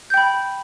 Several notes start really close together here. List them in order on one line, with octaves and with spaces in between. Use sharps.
G6 G5 B5